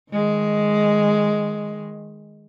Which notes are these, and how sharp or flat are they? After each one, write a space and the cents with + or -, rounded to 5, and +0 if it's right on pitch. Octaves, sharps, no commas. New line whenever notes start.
D#3 +0 G#3 +5